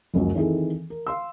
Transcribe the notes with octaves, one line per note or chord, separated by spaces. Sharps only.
F#1 C#2 F#2 F3 F#3
D#3 E3 C4 E4 G#4 A4
A#4
F5 C6 E6